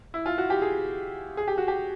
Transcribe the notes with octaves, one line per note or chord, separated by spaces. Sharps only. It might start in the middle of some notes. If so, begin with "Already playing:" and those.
E4
F4
F#4
G4
G#4
G#4
G4
F#4
G4